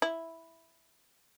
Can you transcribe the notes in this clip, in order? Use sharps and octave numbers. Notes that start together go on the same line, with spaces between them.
E4